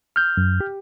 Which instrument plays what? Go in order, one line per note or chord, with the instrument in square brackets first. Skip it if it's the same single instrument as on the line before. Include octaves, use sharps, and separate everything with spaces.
[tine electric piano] F6 G6
[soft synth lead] F#2
G4